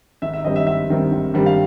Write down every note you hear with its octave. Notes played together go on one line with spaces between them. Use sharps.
G#1 E5
E5
G2 D#3 G3 C4 D#5
E5
G#1 E5
G2 D#3 G3 C4
G#1
G2 D#3 G3 C4
F5